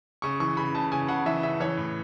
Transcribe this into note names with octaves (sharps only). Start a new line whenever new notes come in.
C#3 C#6
E3 C#6
C#3 B5
C#3 A5
C#3 G#5
C#3 F#5
E3 E5
C#3 E5
E3 C#5
A2